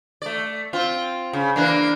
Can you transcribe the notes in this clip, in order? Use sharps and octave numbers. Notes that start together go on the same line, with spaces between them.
A3 D5
C4 F4
C#3
E3 A#3 D4